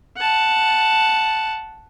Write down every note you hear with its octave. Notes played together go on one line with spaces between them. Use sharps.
F#5 A5